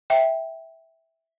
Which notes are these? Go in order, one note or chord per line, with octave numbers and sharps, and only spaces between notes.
E5 G5